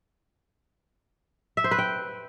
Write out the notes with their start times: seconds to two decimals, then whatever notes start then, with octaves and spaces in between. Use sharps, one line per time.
1.57 E5
1.64 C5
1.71 B4
1.79 G5